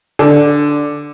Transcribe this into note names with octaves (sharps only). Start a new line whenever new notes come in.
D3